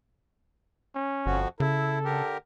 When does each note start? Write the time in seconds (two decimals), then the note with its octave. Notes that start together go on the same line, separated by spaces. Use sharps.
0.95 C#4
1.26 G1 F2 F3 F#4
1.60 C#3 E4 A4
2.05 D3 G4 A#4